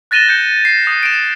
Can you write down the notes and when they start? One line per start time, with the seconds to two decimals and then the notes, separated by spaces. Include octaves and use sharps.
0.11 F#6 A6 A#6 D#7 E7 G7
0.29 G6 C#7
0.65 C7
0.87 D#6
1.03 D7 E7
1.20 E7